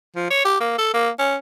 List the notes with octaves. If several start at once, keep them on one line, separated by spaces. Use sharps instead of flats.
F3
C#5
G4
A#3
A4
A#3
C#4